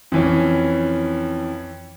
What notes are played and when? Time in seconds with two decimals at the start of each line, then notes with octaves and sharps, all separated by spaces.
0.12 F2 E3 C#4